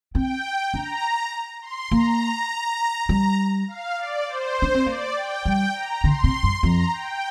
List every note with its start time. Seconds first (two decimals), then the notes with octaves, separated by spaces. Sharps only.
0.14 C4 G5
0.73 D4 A#5
1.62 C6
1.91 A#3 A#5
3.09 G3 A#5
3.68 F5
3.97 D5
4.27 C5
4.62 D4
4.75 C4
4.86 A#3 D5
5.16 G5
5.45 G3 G5
5.74 A#5
6.04 D3 C6
6.24 C3
6.43 G2
6.63 F2 A#5
6.93 G5